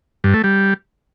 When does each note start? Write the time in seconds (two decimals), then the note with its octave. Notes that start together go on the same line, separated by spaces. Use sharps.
0.24 G2
0.34 A3
0.44 G3